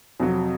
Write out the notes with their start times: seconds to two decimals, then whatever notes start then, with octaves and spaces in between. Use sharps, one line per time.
0.20 F2 C3 F#3